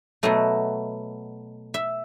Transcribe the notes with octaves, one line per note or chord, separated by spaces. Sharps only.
B2 F#3 A3 D#5
E5